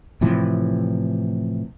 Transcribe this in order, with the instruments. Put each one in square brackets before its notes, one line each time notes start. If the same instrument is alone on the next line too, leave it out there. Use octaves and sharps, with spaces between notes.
[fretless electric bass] A2 C3 E3 F3